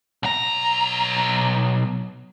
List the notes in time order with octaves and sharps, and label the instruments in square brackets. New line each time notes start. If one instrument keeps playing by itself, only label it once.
[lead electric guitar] B1 A#5